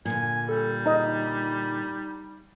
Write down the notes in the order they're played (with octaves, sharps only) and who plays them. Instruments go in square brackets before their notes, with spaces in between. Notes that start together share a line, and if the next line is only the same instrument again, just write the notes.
[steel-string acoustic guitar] A#2 D3 [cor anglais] G#5
[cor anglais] G3 [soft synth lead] A4
[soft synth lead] D#4 [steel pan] D#5 A#5